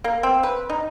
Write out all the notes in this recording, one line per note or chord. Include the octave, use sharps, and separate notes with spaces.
A#3
C4
B4
D#4